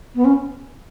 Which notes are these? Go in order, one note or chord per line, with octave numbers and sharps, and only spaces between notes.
B3
C#4